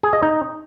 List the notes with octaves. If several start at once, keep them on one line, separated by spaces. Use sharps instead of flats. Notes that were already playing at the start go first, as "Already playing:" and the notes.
G#4
D#5
D#4